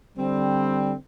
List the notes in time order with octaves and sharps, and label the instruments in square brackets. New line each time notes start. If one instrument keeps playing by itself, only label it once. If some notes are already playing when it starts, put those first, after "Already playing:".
[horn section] D3 G3 C4